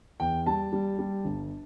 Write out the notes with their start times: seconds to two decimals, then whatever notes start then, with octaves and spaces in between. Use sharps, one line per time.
0.20 E2 G5
0.46 G3 A5
0.73 G3
0.99 G3
1.25 G1